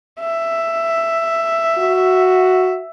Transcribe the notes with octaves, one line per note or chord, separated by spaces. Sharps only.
E5
F#4